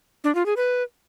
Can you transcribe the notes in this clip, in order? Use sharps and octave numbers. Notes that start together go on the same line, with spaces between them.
D4
F4
G#4
B4